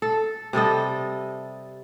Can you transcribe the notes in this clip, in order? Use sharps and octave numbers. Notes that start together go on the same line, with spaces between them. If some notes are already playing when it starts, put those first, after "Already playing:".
A4
C3 G3 A4 D#5